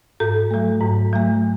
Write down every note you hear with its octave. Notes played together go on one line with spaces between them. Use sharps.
G#2 A4
F#3 A3
G#2
F#3 A3